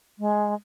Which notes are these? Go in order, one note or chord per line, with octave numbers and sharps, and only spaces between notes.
G#3